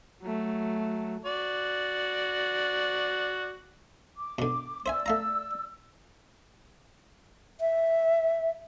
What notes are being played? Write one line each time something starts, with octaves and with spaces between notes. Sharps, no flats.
F#3 A3
F#4 D5
D6
B2 D3
C5 D5 E5 G#5 E6
A3 F5 A#5
E5